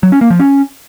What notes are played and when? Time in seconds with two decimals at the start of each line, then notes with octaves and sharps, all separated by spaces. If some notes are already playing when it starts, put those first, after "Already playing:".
0.03 F#3
0.12 C#4
0.21 A#3
0.30 F3
0.39 C#4